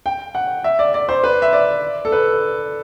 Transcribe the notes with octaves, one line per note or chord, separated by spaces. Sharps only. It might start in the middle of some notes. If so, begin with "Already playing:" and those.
G5
F#5
E5
D5
D5
C5
B4
E5
D5
A4
B4